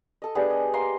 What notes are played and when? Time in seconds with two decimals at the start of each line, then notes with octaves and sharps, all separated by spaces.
0.22 A4 D#5
0.35 B3 D4 G4 G#4
0.50 D#5
0.74 A#3 A#4 D#5 C6